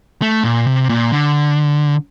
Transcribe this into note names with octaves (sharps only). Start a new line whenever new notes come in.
A3
A#2
C3
A#2
D3